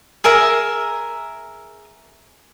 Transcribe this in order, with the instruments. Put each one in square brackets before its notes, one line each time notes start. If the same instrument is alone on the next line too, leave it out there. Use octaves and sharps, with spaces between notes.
[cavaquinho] G#4 A#4 E5 A#5